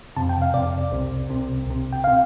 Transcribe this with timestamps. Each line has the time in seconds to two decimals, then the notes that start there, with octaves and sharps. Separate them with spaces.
0.16 F2 C3 A5
0.29 G5
0.42 F5
0.54 F2 C3 D5
0.92 C2 C3
1.29 C2 C3
1.66 C2 C3
1.93 G5
2.04 C3 F5